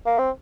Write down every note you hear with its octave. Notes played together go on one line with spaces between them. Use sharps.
A#3
C4